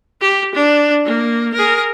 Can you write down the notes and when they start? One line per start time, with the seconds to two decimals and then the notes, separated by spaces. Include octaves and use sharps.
0.21 G4
0.55 D4
1.05 A#3
1.54 G#4 A#4